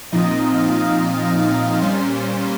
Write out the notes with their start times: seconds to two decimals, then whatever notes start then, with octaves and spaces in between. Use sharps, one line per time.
0.12 A#2 F3 C4 D#4 D#5
0.55 F5
1.40 F5
1.81 A#2 G3 C#4 C5